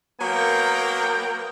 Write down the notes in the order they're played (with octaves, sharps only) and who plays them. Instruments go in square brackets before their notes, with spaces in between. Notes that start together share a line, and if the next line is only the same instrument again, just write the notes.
[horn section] F#3 A#3 B3 A#4 G5